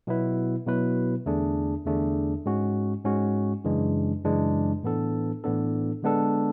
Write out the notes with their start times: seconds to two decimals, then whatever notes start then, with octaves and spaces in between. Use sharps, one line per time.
0.07 B2 F#3 B3 E4 B4
0.67 B2 F#3 B3 E4 B4
1.26 E2 D3 A3 D4 G#4
1.86 E2 D3 A3 D4 G#4
2.46 G#2 G#3 C#4 F#4
3.05 G#2 G#3 C#4 F#4
3.64 F#2 C#3 E3 G#3 D4
4.25 F#2 C#3 E3 G#3 D4
4.83 A2 E3 B3 D4 A4
5.44 A2 E3 B3 D4 A4
6.02 D3 G#3 B3 D4 A4